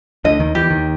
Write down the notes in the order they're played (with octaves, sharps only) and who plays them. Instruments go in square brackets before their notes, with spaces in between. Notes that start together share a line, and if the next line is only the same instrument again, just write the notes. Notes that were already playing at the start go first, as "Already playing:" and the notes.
[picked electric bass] D2 D3 [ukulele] D#5
[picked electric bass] D#2 D#3
[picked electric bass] E2 E3 [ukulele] G4
[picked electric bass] D#2 D#3